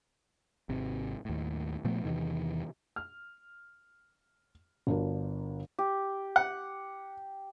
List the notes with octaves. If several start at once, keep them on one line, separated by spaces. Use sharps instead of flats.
G#1 C3
D#2 A2
A#2 F3 A3 B3
E2 C3 D#3 E3
F6
G1 D4 F#4 A#4
G4
F#5